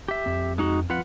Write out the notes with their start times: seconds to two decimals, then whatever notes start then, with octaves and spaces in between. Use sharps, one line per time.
0.08 G4 E5
0.26 F2 C4
0.58 G#3 D#4 F#4
0.90 F3 C4 F4 B4 F#5